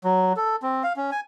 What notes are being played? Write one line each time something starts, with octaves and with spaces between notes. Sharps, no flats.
F#3
A4
C4
F5
C#4
G#5